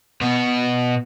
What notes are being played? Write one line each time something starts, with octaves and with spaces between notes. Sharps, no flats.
B2 B3